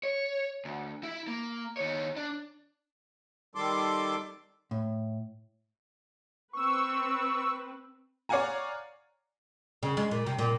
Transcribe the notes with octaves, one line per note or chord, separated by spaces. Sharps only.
C#5
D2
E4
A#3
D#3 C#5
D4
D#3 G3 A4 C6 D6
A2
C4 B4 C#6 E6
C#5 D5 F5 F#5 G#5 A#5
C#3
G#3
A#2
C3
A#2